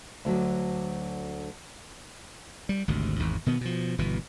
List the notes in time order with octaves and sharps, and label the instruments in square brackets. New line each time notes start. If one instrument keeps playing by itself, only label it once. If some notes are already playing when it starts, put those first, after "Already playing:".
[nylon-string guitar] D2 D3 F#3
[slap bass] G3
G#1 D2 C3
G#1 E2 G#2
B2 D#3 B3
B2 F3
G1 B2 E3